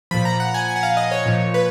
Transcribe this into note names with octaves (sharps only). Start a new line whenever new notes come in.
A#2 F3 B5
A#5
F#5
G#5
G#5
F#5
F5
D#5
C#5
A#2 F3
B4